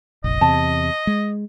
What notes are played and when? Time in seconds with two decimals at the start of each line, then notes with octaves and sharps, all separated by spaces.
0.24 F1 A#1 D#5
0.41 E2 C3 A5
1.07 G#3